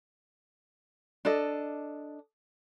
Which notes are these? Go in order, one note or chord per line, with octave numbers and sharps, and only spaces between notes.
D4 A4 D#5